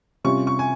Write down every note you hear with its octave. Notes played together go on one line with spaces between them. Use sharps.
C3 G3 C#4 F4 C#6
C#6
G#5